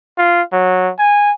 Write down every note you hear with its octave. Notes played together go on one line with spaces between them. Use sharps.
F4
F#3
G#5